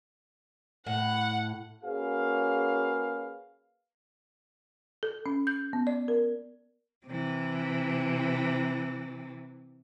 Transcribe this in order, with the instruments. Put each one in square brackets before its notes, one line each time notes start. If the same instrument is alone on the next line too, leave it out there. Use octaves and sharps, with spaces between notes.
[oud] A2 [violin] F#5
[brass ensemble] A#3 C#4 F#4 G#4 B4 F5
[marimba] A4
C#4
G6
B3
D5
A#4
[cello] C3 E3